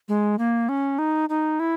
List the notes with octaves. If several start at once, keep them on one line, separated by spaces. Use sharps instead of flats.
G#3
A#3
C#4
D#4
D#4
E4